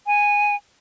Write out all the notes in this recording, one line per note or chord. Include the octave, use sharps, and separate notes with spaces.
G#5